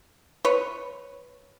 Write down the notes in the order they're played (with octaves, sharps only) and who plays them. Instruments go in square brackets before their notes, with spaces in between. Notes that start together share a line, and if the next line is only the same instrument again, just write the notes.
[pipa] B4 C#5